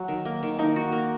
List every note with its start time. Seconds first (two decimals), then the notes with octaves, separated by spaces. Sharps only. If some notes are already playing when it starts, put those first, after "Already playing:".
Already playing: F#3 F#4
0.08 D#3
0.25 A#3
0.43 D#3
0.59 A#3 D#4
0.76 F#4
0.92 A#3